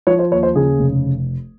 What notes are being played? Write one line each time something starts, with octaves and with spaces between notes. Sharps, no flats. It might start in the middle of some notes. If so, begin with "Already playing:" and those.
F3 C#5
C5
D#2 C#5
C5
C#3 G#4
F1